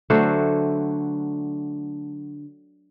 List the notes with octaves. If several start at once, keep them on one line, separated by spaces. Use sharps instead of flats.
D3 F#3 A3 C5